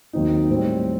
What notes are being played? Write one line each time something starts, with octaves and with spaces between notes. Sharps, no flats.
D#2 D#3 F#3 C4 D#4
A2 G3 C4